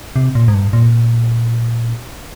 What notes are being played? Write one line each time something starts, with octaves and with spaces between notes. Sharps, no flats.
C3
A#2
G#2
G2
A#2